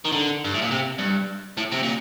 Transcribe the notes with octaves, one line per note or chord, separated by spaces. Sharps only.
D#3
D3
G2
A2
A#2
C3
G2
A2
C3
A#2